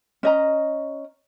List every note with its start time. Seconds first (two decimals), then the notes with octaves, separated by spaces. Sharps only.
0.23 C#4 D#5 A#5